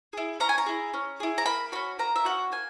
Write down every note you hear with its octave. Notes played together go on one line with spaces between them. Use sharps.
E4 G#4
C#4 A#5
G#5
A#5
E4 G#4
C#4
E4 G#4
A#5
A#3 B5
C#4 F#4 B5
A#3 A#5
E5
C#4 F#4 F#5
A#3 G#5